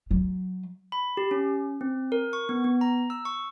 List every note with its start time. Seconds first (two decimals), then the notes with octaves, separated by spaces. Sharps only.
0.11 F#3
0.92 B5
1.17 G4
1.31 C#4
1.81 C4
2.12 A#4
2.33 C#6
2.49 B3
2.64 B3
2.81 A#5
3.10 E6
3.25 C#6